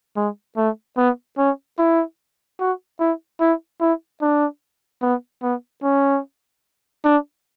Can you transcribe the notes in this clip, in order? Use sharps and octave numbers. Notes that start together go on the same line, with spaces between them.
G#3
A3
B3
C#4
E4
F#4
E4
E4
E4
D4
B3
B3
C#4
D4